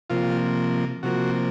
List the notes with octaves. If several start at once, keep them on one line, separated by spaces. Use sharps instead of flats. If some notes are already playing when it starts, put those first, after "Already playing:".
C3 F3 A#3 F4
C3 F3 A#3 F#4